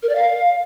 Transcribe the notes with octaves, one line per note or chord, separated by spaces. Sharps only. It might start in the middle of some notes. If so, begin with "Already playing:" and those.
A#4
D5
F5